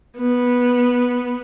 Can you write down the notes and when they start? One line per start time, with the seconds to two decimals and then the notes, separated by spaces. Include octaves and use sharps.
0.18 B3